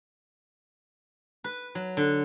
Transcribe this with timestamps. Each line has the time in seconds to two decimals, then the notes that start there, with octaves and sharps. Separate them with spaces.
1.44 B4
1.75 F#3
1.97 D3